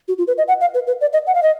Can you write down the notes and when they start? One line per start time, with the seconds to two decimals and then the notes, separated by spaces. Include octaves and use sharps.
0.08 F#4
0.18 F4
0.27 B4
0.38 D#5
0.48 F#5
0.61 F5
0.74 B4
0.87 B4
1.01 D5
1.13 D#5
1.27 F#5
1.34 F5
1.43 D#5